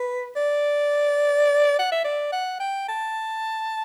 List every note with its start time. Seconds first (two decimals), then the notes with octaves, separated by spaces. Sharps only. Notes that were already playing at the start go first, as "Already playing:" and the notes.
Already playing: B4
0.36 D5
1.79 F#5
1.92 E5
2.05 D5
2.32 F#5
2.60 G5
2.89 A5